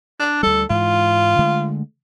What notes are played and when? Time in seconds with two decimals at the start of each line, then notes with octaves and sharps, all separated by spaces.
0.20 D4
0.43 D2 G3 A4
0.70 G#2 E3 F4
1.39 D3 G#3 A3